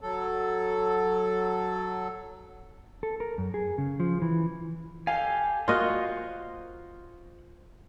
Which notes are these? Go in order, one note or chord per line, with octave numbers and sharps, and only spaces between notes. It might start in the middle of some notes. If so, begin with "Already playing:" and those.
F#3 A4
A4
A#4
F#2
G#4
C#3
F3
E3
G4 A4 F5 G#5
A#3 F4 F#4 C5 D#5 C#6 F#6